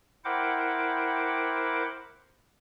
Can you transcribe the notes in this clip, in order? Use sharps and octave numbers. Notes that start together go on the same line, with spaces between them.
E4 A#4 C5 F#5 G5 D6